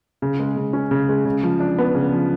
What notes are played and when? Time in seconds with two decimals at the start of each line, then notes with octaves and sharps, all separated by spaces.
0.22 C#3
0.40 G#3
0.57 C#3
0.73 C#4
0.91 C#3
1.09 G#3
1.25 C#3
1.43 F3
1.60 D4
1.78 B3
1.95 C#3
2.13 F3